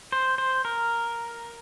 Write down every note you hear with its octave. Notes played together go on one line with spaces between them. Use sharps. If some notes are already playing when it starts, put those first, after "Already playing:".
C5
C5
A#4